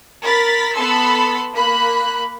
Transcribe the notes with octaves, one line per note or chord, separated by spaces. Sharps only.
A#4 B5 A6 B6
B3 A4 A5 B5 C6 E6
A#3 B5 F#6